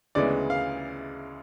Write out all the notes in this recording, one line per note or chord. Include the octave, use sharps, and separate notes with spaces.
D2 C#3 E3 G#3 B3 D5
F5